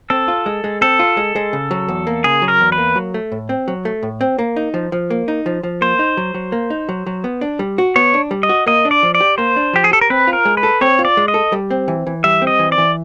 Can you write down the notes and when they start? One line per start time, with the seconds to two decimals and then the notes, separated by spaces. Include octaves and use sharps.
0.10 C4 A4
0.28 F4
0.46 G#3
0.64 G#3
0.81 C4 A4
0.99 F4
1.17 G#3
1.36 G#3
1.53 C#3
1.71 F#3
1.88 E2
2.07 A#3
2.24 C#3 G#4
2.42 F#3
2.48 A#4
2.61 E2
2.72 B4
2.78 A#3
2.96 F#3
3.14 A3
3.32 A2
3.49 C4
3.68 F#3
3.85 A3
4.03 A2
4.21 C4
4.38 A#3
4.56 D#4
4.74 F3
4.92 F3
5.10 A#3
5.28 D#4
5.46 F3
5.63 F3
5.81 A#3 C5
5.99 D#4
6.17 F#3
6.34 F#3
6.52 A#3
6.70 D#4
6.89 F#3
7.06 F#3
7.24 B3
7.41 D4
7.59 G3
7.78 F#4
7.96 B3 C#5
8.14 D4
8.31 G3
8.43 D#5
8.49 F#4
8.66 A#3 D#5
8.85 D4
8.91 D5
9.03 F3
9.15 D5
9.21 G4
9.38 A#3 C5
9.56 D4
9.73 F3 G4
9.84 G#4
9.92 G4 A4
10.01 A#4
10.10 C4 B4
10.27 F4
10.33 A#4
10.45 G#3
10.57 B4
10.63 A4
10.81 C4 C#5
10.99 F4
11.05 D5
11.17 G#3
11.28 D#5
11.34 A4
11.52 G3
11.70 C4
11.88 E3
12.07 E3
12.24 G3 E5
12.42 C4
12.47 D#5
12.59 E3
12.72 D5
12.78 E3